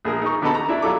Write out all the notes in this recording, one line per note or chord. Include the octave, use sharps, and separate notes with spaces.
A#1 G#4 A#4
D#4 C#6
D3 B3 A4 D#5 A5 B5
A#5
D4 E4 E5
F#3 F4 A4 D6